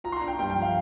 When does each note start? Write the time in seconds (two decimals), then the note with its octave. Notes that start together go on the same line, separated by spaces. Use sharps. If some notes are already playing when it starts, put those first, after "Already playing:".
0.04 F4 A#5
0.12 C6
0.16 D4 A#5
0.28 G5
0.39 G2 G5
0.50 G5
0.55 F3
0.62 F5